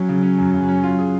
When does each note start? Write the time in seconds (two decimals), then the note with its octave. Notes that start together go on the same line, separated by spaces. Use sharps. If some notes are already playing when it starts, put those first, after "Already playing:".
Already playing: F#3 C#4
0.09 C#3
0.23 C#4
0.38 F#2
0.54 C#3
0.69 C#4
0.84 F4
0.99 G#4